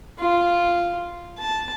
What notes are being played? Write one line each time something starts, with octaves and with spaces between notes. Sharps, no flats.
F4
A5